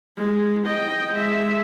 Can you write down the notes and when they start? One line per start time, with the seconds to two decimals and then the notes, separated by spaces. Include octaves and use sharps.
0.17 G#3
0.67 D#5 G5
1.14 G#3 E5